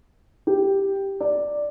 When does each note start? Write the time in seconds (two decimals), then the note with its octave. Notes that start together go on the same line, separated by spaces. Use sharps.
0.47 G4
1.21 D5